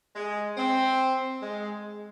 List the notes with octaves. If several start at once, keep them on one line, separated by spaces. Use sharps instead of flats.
G#3
C4
G#3